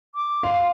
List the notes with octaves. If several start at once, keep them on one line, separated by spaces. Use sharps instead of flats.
D6
F5 C6